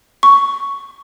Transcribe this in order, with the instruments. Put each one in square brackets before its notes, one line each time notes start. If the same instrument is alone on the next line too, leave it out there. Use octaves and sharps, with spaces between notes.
[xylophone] C#6